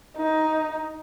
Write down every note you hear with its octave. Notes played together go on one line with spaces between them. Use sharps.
D#4